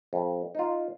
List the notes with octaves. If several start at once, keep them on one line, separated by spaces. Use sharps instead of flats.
F2
D#4 F4